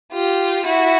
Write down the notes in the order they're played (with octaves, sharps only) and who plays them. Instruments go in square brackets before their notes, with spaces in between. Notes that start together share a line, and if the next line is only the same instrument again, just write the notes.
[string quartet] F4 G4
E4 F#4